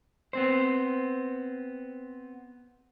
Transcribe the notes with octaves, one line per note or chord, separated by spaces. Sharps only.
B3 C4 C5